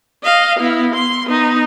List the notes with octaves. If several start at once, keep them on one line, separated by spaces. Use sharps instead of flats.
D#5 F5
B3 E4
C6
B3 D#4